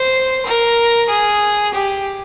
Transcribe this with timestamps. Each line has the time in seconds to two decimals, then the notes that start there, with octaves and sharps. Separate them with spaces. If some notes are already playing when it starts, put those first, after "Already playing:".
Already playing: C5
0.46 A#4
1.09 G#4
1.74 G4